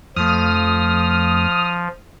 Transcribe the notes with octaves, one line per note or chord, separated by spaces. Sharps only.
F2 F3 A3 D#6 F6